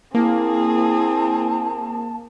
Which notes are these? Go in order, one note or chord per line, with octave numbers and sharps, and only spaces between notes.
A#3 C4 E4 G#4 A5